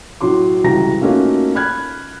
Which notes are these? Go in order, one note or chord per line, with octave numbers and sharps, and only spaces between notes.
A2 F#3 F#4 C6 D6
C#2 E3 G3 F#4 A#5 A#6
A3 A#3 C#4 D#4 F4 F#4
B5 F6 F#6 G#6